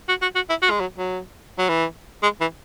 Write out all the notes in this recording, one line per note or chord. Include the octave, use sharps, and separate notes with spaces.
F#4
F#4
F#4
E4
F#4
G#3
F#3
F#3
F#3
E3
G#3
E3